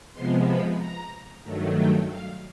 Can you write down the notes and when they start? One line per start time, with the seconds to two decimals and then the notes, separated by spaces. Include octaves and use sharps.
0.14 C3 F3 G#3 B3 C6
0.47 B5
0.78 A#5
1.44 G2 D#3 F#3 A3
1.77 G5
2.10 F5